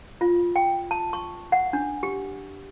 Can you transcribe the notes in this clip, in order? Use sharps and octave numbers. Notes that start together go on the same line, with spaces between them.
F4
G5
A5
C#6
F#5
D4
G4